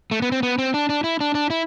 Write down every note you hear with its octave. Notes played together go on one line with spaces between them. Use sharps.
A3
B3
C4
B3
C4
D4
D4
E4
D4
D4
E4